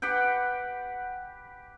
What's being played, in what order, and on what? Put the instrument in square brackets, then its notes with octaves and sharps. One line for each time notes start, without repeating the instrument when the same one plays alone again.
[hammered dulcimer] G4 B4 F#5 G5